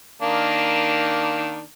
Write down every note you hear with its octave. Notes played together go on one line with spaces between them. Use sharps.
D#3 A#3 D4